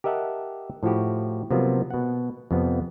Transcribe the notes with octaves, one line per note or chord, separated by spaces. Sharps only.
G4 A#4 D#5 E5 F#5 A5
A2 F3 E4 F#4 G4
C3 F3 F#3 A#3 B3
B2 F#5
F2 C3 F3 B3